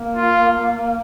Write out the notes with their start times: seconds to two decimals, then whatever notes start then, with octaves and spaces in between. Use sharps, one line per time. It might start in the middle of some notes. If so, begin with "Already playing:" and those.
Already playing: A#3
0.16 F4